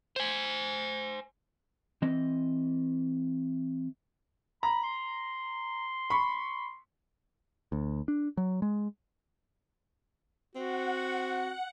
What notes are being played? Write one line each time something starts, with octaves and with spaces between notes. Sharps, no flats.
C5 G#5
E3 C4 D#5
A#5 B5
C6
B5 C#6
D2
D4
F#3
G#3
C4 F#4 F#5